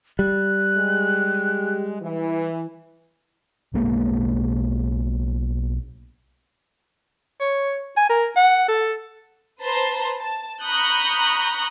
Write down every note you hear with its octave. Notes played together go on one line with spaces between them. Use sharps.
G3 F#6
G#3 G4
E3
B1 B2 G#3 A#3
C#5
G#5
A#4
F#5
A4
B4 C5 A5 A#5 C6
A5
A#5 B5 C#6 D#6 F#6 G6